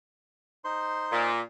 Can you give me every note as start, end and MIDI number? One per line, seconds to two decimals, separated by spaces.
0.64 1.30 63
0.64 1.30 72
0.64 1.30 84
1.11 1.39 46